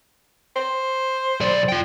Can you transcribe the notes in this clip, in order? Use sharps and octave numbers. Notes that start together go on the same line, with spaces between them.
C5
B1 D5
F4 G5